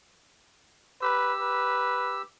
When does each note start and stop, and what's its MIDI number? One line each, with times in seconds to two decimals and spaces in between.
1.02 2.22 67
1.02 1.33 71
1.02 2.22 88
1.41 2.23 71